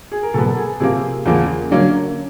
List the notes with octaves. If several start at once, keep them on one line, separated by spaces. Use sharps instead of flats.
G#4
A#4
B2 F#3 B3 A4
G#4
C3 F3 A#3 G#4
E2 C#3 F3 A#3
D3 F#3 A#3 C#4